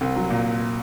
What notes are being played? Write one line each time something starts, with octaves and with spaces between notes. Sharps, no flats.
C2
F#3
A#2